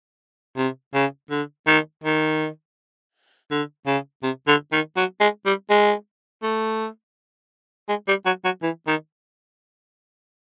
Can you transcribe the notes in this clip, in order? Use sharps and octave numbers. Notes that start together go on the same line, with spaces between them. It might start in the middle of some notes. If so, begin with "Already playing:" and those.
C3
C#3
D3
D#3
D#3
D3
C#3
C3
D3
D#3
F#3
G#3
G3
G#3
A3
G#3
G3
F#3
F#3
E3
D#3